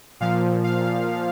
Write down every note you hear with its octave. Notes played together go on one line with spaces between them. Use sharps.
A#2 F3 F5
F5